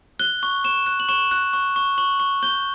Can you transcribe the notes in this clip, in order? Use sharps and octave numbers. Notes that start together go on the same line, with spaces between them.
F#6 G7
C#6
C#6 E7
F#6
F#7
C#6 E7
F#6
C#6
C#6
C#6 F#7
C#6
G6 G7